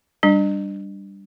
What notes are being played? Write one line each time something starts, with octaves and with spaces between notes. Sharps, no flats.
G3 D4